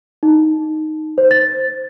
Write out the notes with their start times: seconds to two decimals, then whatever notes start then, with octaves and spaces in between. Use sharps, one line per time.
0.23 D#4
1.18 C5
1.31 A6